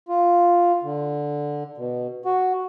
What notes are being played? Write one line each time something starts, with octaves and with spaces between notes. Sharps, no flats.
F4
D3
B2
F#4